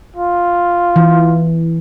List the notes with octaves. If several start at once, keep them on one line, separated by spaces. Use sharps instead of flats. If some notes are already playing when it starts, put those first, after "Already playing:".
F4
E3